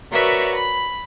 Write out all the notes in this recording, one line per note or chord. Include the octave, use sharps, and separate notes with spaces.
F#4 A#4 B4 C#5 D5 E5
B5